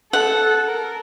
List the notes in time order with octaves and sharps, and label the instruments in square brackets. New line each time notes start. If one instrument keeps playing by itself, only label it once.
[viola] A4 [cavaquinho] F#5
[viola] A#4